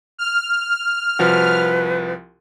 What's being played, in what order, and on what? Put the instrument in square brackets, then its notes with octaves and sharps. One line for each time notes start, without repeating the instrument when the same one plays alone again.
[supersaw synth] F6
[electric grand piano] C2 F3 F#4 [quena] B4